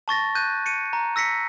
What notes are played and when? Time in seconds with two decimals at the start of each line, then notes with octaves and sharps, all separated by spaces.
0.08 A5 C#6 A6 A#6
0.35 F#6 G6 D#7
0.66 C#7 D#7
0.93 A#5
1.16 E6 A#6 B6 C#7